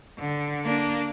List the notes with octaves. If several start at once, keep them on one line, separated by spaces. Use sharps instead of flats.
D3
A#3 D4